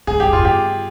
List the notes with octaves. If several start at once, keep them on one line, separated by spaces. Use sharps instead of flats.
G#2 G#4
G2 G4
F2 F4
G2
G4